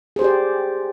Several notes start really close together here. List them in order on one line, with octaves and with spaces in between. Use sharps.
G#4 C5 G4 D5